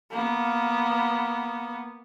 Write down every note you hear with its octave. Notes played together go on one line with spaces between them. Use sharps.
A#3 B3